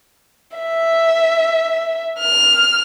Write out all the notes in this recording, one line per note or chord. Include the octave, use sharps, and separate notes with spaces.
E5
F6